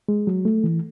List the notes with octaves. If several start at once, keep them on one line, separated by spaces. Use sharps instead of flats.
G#3
F#3
A3
E3